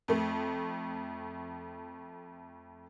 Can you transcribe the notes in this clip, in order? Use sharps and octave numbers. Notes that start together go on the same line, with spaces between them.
F2 A3